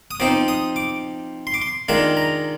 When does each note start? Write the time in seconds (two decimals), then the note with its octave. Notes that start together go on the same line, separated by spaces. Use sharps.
0.11 D#6
0.20 F3 C4 D#4 D6
0.48 D#6
0.76 D6
1.47 C6
1.54 D6
1.62 C6
1.88 D#3 G#3 D4 F4 A#5
2.17 A#5